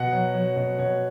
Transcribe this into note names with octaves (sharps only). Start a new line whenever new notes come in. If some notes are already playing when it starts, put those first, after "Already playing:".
Already playing: B2 F#5
F#3
F#3
B2
B2 C#5